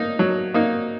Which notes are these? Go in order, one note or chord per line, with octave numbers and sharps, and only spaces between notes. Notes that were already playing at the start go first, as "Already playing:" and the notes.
Already playing: A#3 D#4
F#3
A#3 D#4